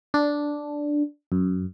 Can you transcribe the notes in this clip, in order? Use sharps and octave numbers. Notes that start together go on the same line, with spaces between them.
D4
F#2